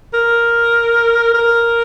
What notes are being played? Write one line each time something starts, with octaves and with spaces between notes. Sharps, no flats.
A#4
A#4